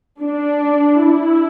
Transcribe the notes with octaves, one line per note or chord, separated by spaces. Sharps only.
D4
E4